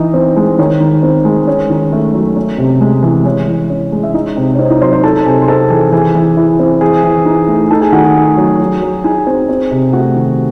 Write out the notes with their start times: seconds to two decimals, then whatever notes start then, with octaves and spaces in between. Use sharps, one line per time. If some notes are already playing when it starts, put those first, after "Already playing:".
Already playing: E3 D#4 D#5
0.14 C4
0.36 G#3
0.58 D#3 C#5
0.80 D#3
1.03 C4
1.25 G#3
1.47 C#4
1.70 D#3
1.92 A3
2.14 F#3
2.36 C#4 C#5
2.58 C3
2.81 G#3
3.03 E3
3.25 E3 C#5
3.48 E3
3.70 C#4
3.92 G#3
4.03 E5
4.14 D#4 D#5
4.37 C3
4.55 C#5
4.59 C4 D#4 D#5
4.70 D#4 D#5
4.82 F#3 C5 C6
4.93 C5 C6
5.03 D#4 A4 A5
5.25 C3 G#4 G#5
5.41 C6
5.48 C4 A4 A5
5.70 E3 G#4 G#5
5.92 E3 G#4 G#5
6.15 E3
6.37 E4
6.59 C4
6.81 E3 G#4 G#5
7.03 E3
7.25 D#4
7.48 A3
7.71 D#4 A4 A5
7.81 G#4 G#5
7.92 D#3 F#4 F#5
8.04 G#4 G#5
8.15 A3
8.37 F#3
8.60 F#3
8.82 F#3
9.04 D#4 G#4 G#5
9.27 C4
9.49 C4
9.71 C3
9.93 A3 F#4 F#5
10.16 D#3